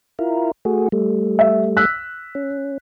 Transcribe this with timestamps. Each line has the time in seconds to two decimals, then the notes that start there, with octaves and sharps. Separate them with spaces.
0.19 E4 F4 A#4
0.65 A3 F#4 G#4
0.92 G3 A3
1.39 E5
1.77 E6 F#6 B6
2.35 C#4